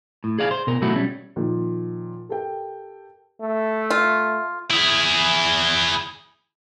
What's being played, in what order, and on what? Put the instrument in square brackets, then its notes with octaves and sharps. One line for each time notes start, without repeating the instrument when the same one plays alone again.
[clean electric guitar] A2
G#4 D5 F5
C5
B2 A#4
B2 F#3 A3 E4 F#4
G3 C#4
[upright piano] A#2 D#3 F3
G4 A4 A#4 G5
[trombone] A3
[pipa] F4
[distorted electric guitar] E4 G#4